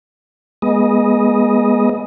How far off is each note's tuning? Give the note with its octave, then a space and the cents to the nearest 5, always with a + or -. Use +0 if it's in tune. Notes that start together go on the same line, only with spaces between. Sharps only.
G#3 +0 B3 -30 D#5 +0